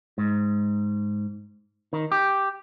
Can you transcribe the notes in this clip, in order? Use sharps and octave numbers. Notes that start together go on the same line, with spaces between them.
G#2
D#3
G4